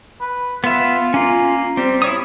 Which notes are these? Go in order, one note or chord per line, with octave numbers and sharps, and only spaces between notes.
B4
B3 F4 E5
A#3 C#4 F4
G3 C4
E4 C#5 D#6